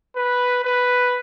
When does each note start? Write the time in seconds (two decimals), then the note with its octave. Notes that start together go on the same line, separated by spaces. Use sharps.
0.16 B4
0.64 B4